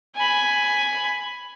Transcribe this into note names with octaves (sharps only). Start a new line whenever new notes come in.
G#5 B5